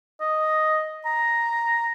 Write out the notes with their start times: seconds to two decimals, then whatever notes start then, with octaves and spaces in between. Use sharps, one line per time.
0.21 D#5
1.05 A#5